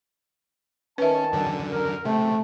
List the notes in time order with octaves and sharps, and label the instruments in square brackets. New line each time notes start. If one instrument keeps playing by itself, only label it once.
[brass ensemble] D#3 A5 [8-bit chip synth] C#4 [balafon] B4 E5
[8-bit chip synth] F#2 D3
[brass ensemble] A#4
[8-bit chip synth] C3 [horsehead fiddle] A3 [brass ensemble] G5